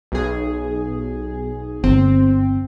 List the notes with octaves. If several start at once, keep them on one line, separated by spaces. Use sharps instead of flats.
B1 G#4
G1 C4